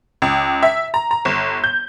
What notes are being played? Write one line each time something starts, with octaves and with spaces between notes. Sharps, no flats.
C#2
E5
A#5
A#5
G1
G6